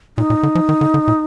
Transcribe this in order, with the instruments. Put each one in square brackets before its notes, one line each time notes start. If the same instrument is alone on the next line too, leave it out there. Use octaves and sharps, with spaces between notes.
[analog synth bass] A#2 [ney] D#4
[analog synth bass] A#2
D3
F3
D#3
D3
D3
A#2